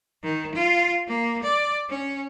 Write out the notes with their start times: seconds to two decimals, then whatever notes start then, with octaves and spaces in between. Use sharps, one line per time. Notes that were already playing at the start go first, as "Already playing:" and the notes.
0.23 D#3
0.55 F4
1.08 A#3
1.43 D5
1.89 C#4